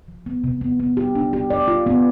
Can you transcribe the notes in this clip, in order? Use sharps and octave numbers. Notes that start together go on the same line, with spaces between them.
F3
B3
C3
B3
B3
G4
D4
G4
D5
F4
B3